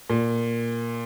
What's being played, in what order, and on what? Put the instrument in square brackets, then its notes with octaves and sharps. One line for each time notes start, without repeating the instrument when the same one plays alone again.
[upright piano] A#2